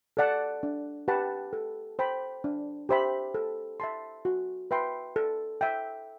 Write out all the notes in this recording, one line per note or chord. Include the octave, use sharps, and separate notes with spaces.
A4 D5 F#5 A5
D4
G4 B4 F#5 A5
A4
C5 G5 B5
D4
G4 C5 E5 B5
A4
E5 A5 C6
F#4
B4 E5 G5 C6
A4
E5 G5